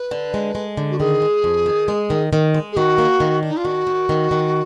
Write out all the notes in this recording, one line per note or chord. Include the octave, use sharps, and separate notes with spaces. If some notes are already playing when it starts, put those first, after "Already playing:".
Already playing: B4
D3
G#3
G#3
D3
F#4
D#3 G#4
G#3
F2
D#3
G#3
D#3
D#3
G#3
G#4
D#3 F#4
A#3
D#3
D4
D#4
F4
D#3 F#4
D#3
D#3
D#3